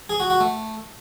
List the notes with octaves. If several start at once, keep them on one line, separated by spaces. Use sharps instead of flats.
G#4
F#4
F#4
A3